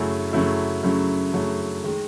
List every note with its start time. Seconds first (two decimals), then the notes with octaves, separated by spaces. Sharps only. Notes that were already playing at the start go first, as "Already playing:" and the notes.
Already playing: F#2 C#3 F#3 A3 E4
0.33 F#2 C#3 F#3 A3 E4
0.83 F#2 C#3 F#3 A3 E4
1.33 F#2 C#3 F#3 A3 E4
1.84 D#3 G#3